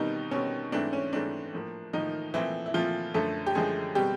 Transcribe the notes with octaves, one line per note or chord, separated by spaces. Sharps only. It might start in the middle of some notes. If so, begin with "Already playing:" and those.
Already playing: B2 D#3 G3 C4 D#4
B2 G3 C4 C#4
G#2 E3 A3 C4 D4
C#4
G#2 E3 A3 C4 D4
A2 F3 A#3
A2 D#3 F3 A#3 D#4
A#2 E3 F3 A3 C4 E4
E4
A#2 F3 A3 C4 F4
F#2 D3 F3 A3 A4
G4
F#2 D3 F3 G#3 A3 G#4
B2 G3 G#3 C4 G4